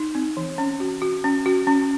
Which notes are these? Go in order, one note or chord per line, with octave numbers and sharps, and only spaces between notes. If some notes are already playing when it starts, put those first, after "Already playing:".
Already playing: D#4
C4
E3
C#4
F#4
F#4
C#4
F#4
C#4